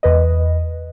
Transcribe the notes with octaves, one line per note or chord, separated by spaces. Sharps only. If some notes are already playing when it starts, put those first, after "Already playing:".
E2 B4 D#5